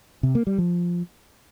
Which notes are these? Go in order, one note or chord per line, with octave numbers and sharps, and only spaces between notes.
C3
A#3
G3
F3